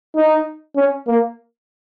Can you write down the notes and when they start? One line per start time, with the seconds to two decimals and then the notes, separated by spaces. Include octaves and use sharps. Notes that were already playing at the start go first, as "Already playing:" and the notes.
0.16 D#4
0.76 C#4
1.07 A#3